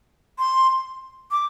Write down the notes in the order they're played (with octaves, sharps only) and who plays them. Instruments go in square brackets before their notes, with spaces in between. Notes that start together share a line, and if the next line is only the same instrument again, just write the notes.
[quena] C6
D6